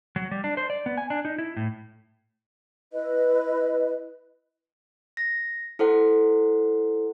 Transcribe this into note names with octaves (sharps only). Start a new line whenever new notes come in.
F#3
G3
D4
C5
D5
B3
G#5
D4
D#4
E4
A2
E4 B4 D#5
A#6
E4 A4 C5 F#5